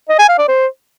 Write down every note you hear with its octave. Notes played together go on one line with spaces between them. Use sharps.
D#5
G#5
F5
D5
C5